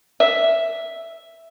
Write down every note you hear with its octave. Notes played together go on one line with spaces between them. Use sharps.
E5